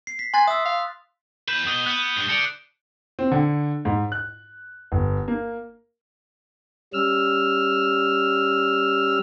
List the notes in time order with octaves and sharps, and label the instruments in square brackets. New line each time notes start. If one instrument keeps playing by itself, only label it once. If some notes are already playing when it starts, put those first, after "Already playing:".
[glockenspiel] C7
B6
[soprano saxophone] G#5 [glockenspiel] C6 F#6 A6
[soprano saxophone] E5 [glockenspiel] D#6 E6
[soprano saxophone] F5
[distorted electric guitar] E2 B4 [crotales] G6 E7
[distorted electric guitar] B2 [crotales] D#6 D#7 G7
[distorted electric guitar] B3 [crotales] F#6
[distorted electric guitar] G2
[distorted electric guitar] A4 D5 [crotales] C#7 D7
[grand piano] C4
D3
G#2
F#6
G1
A#3
[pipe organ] G3 C#4 E6 F6